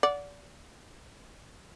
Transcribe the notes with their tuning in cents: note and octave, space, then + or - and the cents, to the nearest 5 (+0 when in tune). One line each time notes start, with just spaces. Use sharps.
D5 -30 F#5 -20